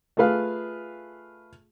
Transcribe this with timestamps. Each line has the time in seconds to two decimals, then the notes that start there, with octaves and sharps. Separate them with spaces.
0.17 A3 F4 G#4 B4 F5